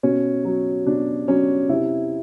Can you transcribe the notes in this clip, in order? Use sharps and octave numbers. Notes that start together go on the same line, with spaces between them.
B2 C#4
F#3
B2 D4
F#3 C#4
C3 E4